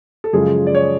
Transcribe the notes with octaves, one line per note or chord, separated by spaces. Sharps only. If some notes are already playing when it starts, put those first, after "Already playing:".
A4
F#2 C#3 F3 G#3 G#4
D5
C#5